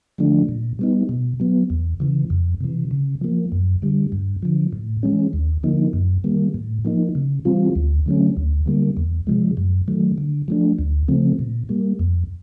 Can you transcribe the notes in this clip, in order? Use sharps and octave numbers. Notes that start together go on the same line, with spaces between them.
D3 F3 A3 D4
A#2
G3 B3 D#4
B2
F#3 B3
E2
C#3 E3
F2
C3 E3
C#3
F3 A#3
F#2
D3 G3
G2
D3 F3
A2
E3 G#3 C#4
D#2
D3 F3 A#3 D#4
F#2
D#3 G3 A#3
A2
F3 A#3 D#4
C#3
E3 G3 C4 F4
D2
D3 F#3 A3 C#4
D2
D3 G3 A#3
E2
C3 F3 G#3
F#2
D#3 F#3 A3
D3
F3 A3 D4
D2
C#3 F3 A3 C4
A#2
G3 A#3
F2